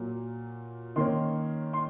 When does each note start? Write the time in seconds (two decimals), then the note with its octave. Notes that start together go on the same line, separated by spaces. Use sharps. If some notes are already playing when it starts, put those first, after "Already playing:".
Already playing: A#2 F#3 A#3
0.96 D#3 A#3 C#4 C6
1.73 C6